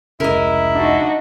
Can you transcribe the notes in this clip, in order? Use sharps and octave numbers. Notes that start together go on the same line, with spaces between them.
F1 C#2 C#3 E4 A#4 D#5
D4 D#4 F#4